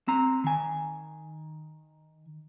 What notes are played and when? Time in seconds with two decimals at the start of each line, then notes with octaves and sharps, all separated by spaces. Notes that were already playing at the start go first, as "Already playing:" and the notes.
0.08 C4 A#5
0.44 D#3 G#5